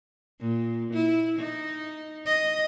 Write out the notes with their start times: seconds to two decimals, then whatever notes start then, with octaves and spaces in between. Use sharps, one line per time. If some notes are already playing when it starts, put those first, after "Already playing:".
0.41 A#2
0.93 E4
1.39 D#4
2.26 D#5